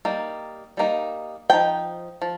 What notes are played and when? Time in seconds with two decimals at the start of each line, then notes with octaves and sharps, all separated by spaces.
0.05 G3 A#3 D#4
0.77 G3 A#3 D#4
1.49 F3 D#4 G5
2.22 F3